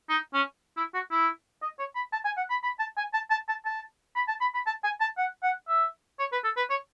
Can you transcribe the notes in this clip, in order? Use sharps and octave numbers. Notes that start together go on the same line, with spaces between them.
D#4
C#4
E4
F#4
E4
D#5
C#5
B5
A5
G#5
F#5
B5
B5
A5
G#5
A5
A5
A5
A5
B5
A5
B5
B5
A5
G#5
A5
F#5
F#5
E5
C#5
B4
A4
B4
C#5